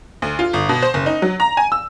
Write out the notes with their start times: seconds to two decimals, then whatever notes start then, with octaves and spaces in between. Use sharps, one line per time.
0.22 D2
0.39 F4
0.53 G1
0.69 B2
0.82 C5
0.94 F#1
1.06 D#4
1.22 F#3
1.40 A#5
1.57 G#5
1.72 E6